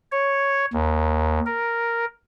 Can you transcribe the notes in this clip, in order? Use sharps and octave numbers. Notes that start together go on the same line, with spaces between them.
C#5
D#2
A#4